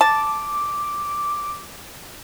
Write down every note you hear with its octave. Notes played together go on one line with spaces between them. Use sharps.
A5 D6